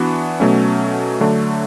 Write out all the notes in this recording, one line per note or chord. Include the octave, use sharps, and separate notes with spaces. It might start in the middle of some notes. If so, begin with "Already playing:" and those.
Already playing: E3 B3 D4 F#4
B2 F#3 A3 C#4
D3 F#3 A3 D4